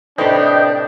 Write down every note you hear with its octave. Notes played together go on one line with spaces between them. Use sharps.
A2 C3 D4 G4 B4 D#5 G5